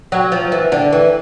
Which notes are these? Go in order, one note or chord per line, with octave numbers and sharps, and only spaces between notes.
F#3
F3
E3
D3
E3